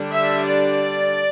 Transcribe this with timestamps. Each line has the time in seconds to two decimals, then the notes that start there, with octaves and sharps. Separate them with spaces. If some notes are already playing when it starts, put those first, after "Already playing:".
Already playing: D3 G3 D4
0.12 E5
0.46 D5